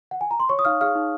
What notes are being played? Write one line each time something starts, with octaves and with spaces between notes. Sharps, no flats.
F#5
G#5
A#5
C6
C#5 C#6
D#6
D#4 F5 F6
G#4 F5 F6
D#4